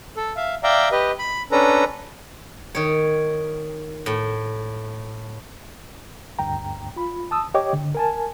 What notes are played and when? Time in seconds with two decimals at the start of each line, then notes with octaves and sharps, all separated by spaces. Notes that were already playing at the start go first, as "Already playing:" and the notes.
0.17 A4
0.36 E5 F5
0.63 D5 E5 F5 G5 A#5
0.92 G4 B4 D#5
1.18 B5
1.51 C#4 D4 A4 B4 A#5
2.75 D#3 C#5
4.06 A2
6.39 D2 G2 G5 A#5
6.96 F4 B5
7.31 A5 D#6 E6
7.54 G4 C#5 D#5 G5 D6
7.73 D3
7.95 A#4 G#5 A5